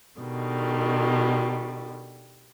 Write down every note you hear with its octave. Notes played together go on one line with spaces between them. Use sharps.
B2 D3 D#3 G3